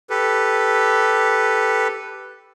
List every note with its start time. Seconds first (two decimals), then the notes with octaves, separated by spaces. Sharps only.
0.10 G4 A4 B4